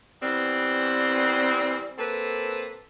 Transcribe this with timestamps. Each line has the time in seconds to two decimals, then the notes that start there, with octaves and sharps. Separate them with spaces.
0.22 E3 G3 B3 C4
1.98 A#3 C4 A4 B4